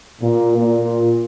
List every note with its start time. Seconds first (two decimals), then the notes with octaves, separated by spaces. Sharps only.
0.21 A#2
0.57 A#2